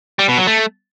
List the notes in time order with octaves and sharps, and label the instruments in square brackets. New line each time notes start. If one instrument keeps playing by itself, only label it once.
[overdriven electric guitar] G3
B2
F#3
A3